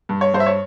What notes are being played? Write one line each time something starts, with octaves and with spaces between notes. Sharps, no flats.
G2
C#5
G2 C5
E5
C#5